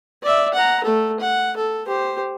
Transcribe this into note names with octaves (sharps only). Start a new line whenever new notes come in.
D5 E5
F#5 A#5
A3 A4
F#5
A4
G4 C5